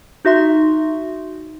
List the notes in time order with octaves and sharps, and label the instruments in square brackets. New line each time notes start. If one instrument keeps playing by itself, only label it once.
[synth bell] D#4 F#4 E5 C6